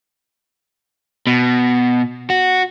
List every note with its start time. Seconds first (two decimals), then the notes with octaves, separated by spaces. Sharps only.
1.27 B2
2.30 F#4